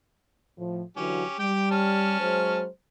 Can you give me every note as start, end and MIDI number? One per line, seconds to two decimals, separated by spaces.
0.58 0.82 45
0.58 0.82 53
0.97 1.24 50
0.97 1.24 52
0.97 1.24 54
0.97 1.36 61
0.97 1.36 67
1.39 2.17 55
1.39 1.70 67
1.39 1.70 79
1.71 2.61 61
1.71 2.61 81
1.71 2.61 89
2.20 2.67 54
2.20 2.67 56
2.20 2.67 72